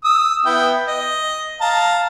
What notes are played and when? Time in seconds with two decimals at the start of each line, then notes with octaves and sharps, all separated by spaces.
0.04 D#6 E6
0.45 B3 E4 G5
0.88 D#5
1.61 F5 A5 A#5